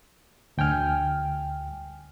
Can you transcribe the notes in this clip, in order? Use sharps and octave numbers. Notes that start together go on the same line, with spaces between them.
D2 G5 G#5 F6